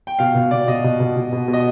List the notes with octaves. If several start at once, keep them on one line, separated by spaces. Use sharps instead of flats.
G5
B2 F5
B2
B2 D5
B2 D#5
B2
B2
B2
B2
B2
D#5